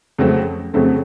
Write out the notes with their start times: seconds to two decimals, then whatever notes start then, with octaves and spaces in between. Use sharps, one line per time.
0.18 F2 C#3 F#3 A3 C4
0.74 F2 C#3 F#3 A3 C4